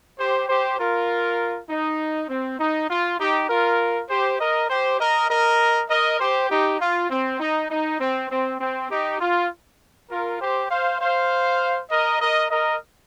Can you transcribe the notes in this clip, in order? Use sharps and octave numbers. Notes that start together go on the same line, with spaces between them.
G4 C5
G4 C5
F4 A#4
D#4
C4
D#4
F4
D#4 G4
F4 A#4
G4 C5
A#4 D#5
G4 C5
A#4 D#5
A#4 D#5
A#4 D#5
G4 C5
D#4 G4
F4
C4
D#4
D#4
C4
C4
C4
D#4 G4
F4
F4 A#4
G4 C5
C5 F5
C5 F5
A#4 D#5
A#4 D#5
A#4 D#5